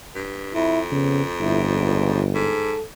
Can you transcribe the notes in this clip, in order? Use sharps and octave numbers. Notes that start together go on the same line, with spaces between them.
G2
F2 E4
C#3 B3
G1 E4
C#2
G#2 A4